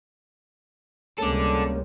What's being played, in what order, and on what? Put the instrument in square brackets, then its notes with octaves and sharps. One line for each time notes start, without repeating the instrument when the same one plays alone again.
[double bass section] C#2 C3 G3 [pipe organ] G#3 A#3 C#4 [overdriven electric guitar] A4 D5